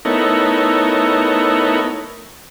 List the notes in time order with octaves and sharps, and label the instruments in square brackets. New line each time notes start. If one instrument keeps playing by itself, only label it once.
[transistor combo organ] A3 B3 D#4 E4 A#4 C#5